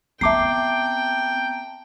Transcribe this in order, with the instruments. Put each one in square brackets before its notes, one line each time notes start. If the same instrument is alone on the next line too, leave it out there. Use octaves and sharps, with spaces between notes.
[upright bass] B3 C4 [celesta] E5 D6 C7 [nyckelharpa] G5 [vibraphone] A5 A#5